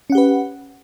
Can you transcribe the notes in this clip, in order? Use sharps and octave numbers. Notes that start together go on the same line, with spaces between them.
C#4 G4 B4 F#5